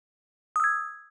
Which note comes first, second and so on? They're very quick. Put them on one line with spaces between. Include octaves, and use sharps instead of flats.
D#6 E6 G#6